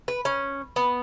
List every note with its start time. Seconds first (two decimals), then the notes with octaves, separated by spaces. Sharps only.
0.08 B4
0.25 C#4
0.76 B3